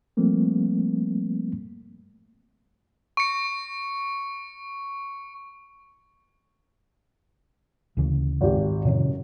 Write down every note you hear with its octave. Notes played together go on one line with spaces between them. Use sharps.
F3 G3 A3 A#3 C4
C#6 C#7
D2 C#3 E3
G#1 G4
F#2 A#2 C#3 E3